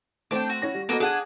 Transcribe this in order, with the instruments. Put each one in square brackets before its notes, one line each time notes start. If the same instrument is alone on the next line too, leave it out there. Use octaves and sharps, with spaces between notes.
[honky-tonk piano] A3 C4 [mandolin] D4 G5
[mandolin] F#4
[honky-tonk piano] C#4 E4 A#6
G3
[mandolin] A#3 D#5 [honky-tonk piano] B3 F#4 A4
[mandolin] D4 F#5 G#5 [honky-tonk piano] G#4